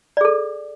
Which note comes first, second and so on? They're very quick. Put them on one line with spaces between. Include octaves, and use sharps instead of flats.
D5 G#4 A4